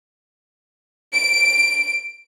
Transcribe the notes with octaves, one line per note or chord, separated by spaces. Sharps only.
D7